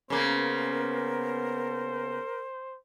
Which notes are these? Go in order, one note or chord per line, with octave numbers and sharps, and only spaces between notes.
C#3 A#3 B3 A#4 C5